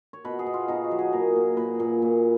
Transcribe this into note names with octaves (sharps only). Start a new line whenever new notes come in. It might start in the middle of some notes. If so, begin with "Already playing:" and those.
C#5
B2 B4
G#4
B2
F4
B2 D#4
F#4
F#3
G#4
A#2 A#4
A#2
A#2 B4
A#2
A#2